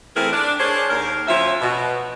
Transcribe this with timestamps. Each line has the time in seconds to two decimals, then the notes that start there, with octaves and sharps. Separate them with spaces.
0.16 E3 A3 C4 G#4 A#4
0.33 D4
0.59 D4 G#4 A#4 C5 C#5
0.90 D#2 A#4
1.28 D2 F3 C#4 E5
1.61 B2